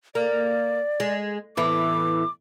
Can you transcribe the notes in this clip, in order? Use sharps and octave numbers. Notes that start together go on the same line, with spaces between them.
A#3 D5
G#3
E2 A2 E3 D6